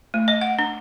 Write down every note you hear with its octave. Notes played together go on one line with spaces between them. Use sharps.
A3
D#5
F#5
D4